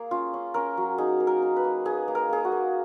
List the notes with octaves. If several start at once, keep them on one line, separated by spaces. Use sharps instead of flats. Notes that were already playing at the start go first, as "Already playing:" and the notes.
Already playing: A#3 G#4
C#4 F4
C#4
C#4 A#4
F#3
D#4 G#4
A#3
A#4
D#4
B4
A#3
D#4 G#4
A#3
A#4
A#3 G#4
F#4
A#3